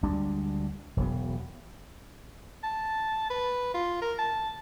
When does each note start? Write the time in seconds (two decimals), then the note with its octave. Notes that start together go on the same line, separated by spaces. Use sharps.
0.03 D2 G3 G#3 D4
0.97 E1 F#3 B3
2.63 A5
3.30 B4
3.74 F4
4.02 A#4
4.19 A5